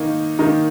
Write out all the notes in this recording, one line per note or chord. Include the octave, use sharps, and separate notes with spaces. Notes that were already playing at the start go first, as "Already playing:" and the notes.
Already playing: D#3 A#3 D#4
D#3 A#3 D#4